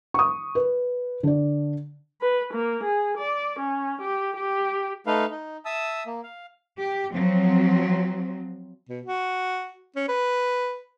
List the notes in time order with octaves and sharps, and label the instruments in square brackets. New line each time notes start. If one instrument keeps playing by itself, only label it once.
[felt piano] C#6 D#6
B4
D3 D5
[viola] B4
A#3
G#4
D5
C#4
G4
G4
[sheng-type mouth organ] A3 D#4 B4 F5
D#4
E5 A5 D#6 E6
A#3
F5
[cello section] G4
F3 F#3 C4
[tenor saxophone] B2
F#4
C#4
B4